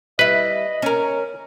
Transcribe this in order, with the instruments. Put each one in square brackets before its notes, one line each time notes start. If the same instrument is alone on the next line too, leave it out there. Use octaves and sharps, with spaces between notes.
[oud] G3 E4 [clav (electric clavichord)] B4 [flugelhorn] D#5
[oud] C#4 A#4